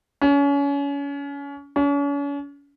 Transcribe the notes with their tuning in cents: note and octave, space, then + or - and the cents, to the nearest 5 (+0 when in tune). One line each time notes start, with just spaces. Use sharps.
C#4 +30
C#4 +40